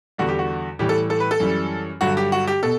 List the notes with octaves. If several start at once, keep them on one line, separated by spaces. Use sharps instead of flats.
E2 D3 G3 F#4
G4
F#4
A2 E3 G3 G4
A4
A4
B4
A4
F#2 E3 G3
G2 D3 F#3 F#4
G4
F#4
G4
B2 A4